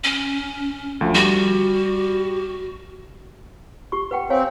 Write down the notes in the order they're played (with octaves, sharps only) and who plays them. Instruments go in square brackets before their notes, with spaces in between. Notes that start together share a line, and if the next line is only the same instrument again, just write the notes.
[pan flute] C#4
[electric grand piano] D2 F3
[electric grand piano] G3 [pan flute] F#4
[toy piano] G4 C#6
B4 F#5 G5
[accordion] C4 [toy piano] C#5 F5 G#5